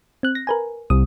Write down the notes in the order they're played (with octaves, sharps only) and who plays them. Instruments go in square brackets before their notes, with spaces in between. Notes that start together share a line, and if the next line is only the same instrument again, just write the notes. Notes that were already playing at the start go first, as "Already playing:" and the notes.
[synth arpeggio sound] C4 F#6
A#6
A#4 B4 G#5
[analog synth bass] C2 [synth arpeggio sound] D#6